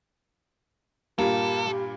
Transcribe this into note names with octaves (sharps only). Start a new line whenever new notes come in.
G2 A#2 A#3 G4 A4